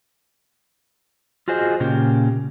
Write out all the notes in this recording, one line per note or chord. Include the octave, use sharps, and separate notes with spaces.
F4 F#4 G#4 C5 D#5
A#2 C#3 A#3 G4